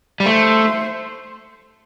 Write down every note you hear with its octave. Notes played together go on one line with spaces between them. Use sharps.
G3
A3 C5